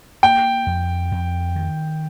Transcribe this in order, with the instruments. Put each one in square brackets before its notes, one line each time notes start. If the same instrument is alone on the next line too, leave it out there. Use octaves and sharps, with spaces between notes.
[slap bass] A#3 [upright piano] G5
[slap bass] F2
F2
D#3